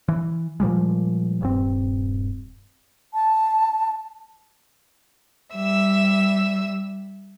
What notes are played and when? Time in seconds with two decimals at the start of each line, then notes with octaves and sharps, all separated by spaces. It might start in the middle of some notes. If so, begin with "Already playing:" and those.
0.08 E3
0.60 A#2 F3 G3 G#3
1.41 D#1 G2 C4
3.14 A5
5.55 G3 E5 E6